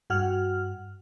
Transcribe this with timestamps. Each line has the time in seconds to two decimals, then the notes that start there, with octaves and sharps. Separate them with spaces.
0.10 G2 F#4 F#5 F6